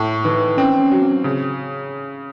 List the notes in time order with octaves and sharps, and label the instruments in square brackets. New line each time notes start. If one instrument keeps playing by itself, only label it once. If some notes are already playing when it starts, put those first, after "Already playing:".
Already playing: [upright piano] A2
[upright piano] E3 [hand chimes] D#4
[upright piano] C4 [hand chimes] C#4
[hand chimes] C#4
[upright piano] F#3
[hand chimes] C4
[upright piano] C#3